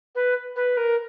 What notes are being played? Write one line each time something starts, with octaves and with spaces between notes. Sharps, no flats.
B4
B4
A#4